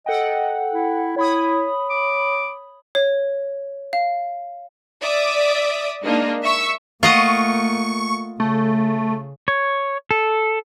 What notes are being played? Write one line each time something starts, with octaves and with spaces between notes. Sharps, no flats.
A4 D#5 F#5 G5
E4
E4 C#5 B5 D#6
D6
C#5
F5
D5 E5 D6 D#6
G#3 A#3 D4 D#4
E5 C#6 E6
A3 A#3 F4 D#5 F#5 C#6
C#3 A3
C#5
A4